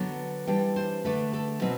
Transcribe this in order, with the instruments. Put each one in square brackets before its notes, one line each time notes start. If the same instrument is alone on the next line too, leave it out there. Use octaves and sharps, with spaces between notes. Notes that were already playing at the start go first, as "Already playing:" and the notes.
Already playing: [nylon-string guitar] D3 F#3 B3 D4
E3 G3 D4 G5
C5
D3 A3 D4 B4
A4
B2 F#3 C4 B4